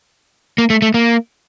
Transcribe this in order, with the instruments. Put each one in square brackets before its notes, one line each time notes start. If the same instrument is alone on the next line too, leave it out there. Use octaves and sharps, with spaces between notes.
[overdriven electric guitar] A#3
A3
A3
A#3